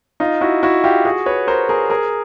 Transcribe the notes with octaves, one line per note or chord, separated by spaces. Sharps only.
D#4 F4
E4 F#4
E4 F#4
F4 G4
F#4 G#4
B4 C#5
A#4 C5
G#4 A#4
G#4 A#4